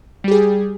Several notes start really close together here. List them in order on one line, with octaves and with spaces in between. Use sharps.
G3 G4 G#4